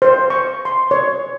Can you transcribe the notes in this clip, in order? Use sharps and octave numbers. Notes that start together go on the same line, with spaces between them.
C5
C#6
C6
C#5